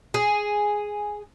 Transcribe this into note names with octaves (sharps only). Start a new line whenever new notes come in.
G#4